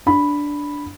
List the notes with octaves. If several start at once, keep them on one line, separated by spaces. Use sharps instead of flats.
D4 B5